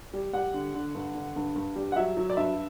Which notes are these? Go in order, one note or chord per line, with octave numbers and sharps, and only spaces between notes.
G3
G3 F#5
D3
D3
G2
D3
G2
G2
G3
F#5
F#3 E5
F#3
D5
G2 E5